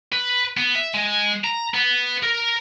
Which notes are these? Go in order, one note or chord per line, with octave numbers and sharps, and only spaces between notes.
B4
B3
E5
G#3
A#5
B3
A#4